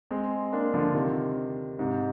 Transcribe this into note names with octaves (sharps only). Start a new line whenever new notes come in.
G#3 C4
A#3 D4
D3 F3
C3 D#3
G#2 C3